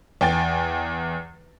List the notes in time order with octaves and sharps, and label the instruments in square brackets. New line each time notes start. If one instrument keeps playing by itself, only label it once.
[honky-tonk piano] E2 G5 G#5 A6